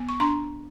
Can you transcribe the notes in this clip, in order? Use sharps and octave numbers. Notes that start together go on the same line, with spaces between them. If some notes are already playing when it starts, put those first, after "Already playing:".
Already playing: B3
C#6
D4 A#5 C6